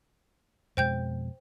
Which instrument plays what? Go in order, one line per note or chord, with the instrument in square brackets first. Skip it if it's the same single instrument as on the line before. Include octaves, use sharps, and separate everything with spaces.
[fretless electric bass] F2 B2 G#3 [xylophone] C5 G5 G6